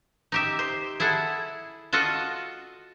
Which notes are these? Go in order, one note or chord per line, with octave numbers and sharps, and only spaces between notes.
D#4 G4 E5
C5
E4 G#4 A4 F#5
F4 F#4 A4 D#5 F#5